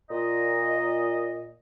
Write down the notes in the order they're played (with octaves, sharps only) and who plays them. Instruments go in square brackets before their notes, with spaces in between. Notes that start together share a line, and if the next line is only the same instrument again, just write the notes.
[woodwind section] A#2 D#5